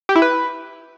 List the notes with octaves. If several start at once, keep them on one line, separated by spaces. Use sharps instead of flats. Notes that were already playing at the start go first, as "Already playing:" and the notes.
G4
E4
B4